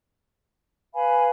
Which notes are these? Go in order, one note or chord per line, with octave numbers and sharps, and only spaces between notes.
B4 F5 G#5 B5